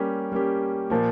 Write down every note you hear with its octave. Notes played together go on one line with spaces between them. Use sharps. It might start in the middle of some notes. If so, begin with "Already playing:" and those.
Already playing: G3 A#3 C#4 G4
G3 A#3 C#4 G4
A#2 F3 A#3